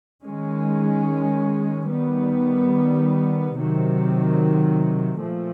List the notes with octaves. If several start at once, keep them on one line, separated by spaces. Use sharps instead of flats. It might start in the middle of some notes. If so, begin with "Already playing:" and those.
D#3 G#3 C#4
D#3 G3 B3
C3 D#3 F#3
A#2 F3 A3